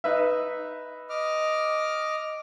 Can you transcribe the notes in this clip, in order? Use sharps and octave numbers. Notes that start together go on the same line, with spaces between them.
D#4 B4 E5
D#5 D6 F6